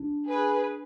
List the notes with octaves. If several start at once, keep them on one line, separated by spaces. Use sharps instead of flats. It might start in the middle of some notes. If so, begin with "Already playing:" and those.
Already playing: D4
G#4 B4